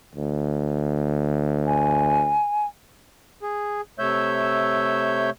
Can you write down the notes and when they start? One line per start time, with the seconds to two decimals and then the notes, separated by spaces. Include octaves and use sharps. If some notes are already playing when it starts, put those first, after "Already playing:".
0.15 D2
1.67 G#5
3.43 G#4
3.99 C3 A3 C#5 E5 E6 G6